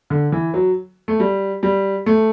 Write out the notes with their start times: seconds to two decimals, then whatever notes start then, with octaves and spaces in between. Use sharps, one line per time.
0.10 D3
0.32 E3
0.54 F#3
1.08 A3
1.20 G3
1.63 G3
2.06 A3